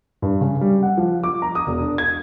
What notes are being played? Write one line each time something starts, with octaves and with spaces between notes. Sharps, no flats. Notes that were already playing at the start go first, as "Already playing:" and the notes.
G2
C#3
G3
F#5
F3
D6
A#5
D#6
E1
D4
G#6